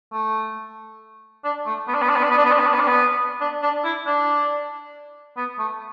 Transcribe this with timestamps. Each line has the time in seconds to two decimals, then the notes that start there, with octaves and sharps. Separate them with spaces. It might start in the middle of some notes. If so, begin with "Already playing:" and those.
0.13 A3
1.44 D4
1.66 A3
1.88 B3
1.95 D4
2.02 B3
2.09 D4
2.16 B3
2.23 D4
2.31 B3
2.37 D4
2.45 B3
2.52 D4
2.59 B3
2.67 D4
2.74 B3
2.80 D4
2.88 B3
3.41 D4
3.62 D4
3.85 E4
4.06 D4
5.37 B3
5.59 A3